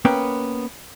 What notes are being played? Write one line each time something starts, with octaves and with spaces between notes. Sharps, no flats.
A#3 B3 C#4 B4 G5